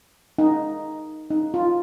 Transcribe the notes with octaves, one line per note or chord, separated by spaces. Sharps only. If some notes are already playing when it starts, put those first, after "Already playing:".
D#4
D#4
F4